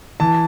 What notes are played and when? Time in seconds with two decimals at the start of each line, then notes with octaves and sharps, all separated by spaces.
0.20 E3 A5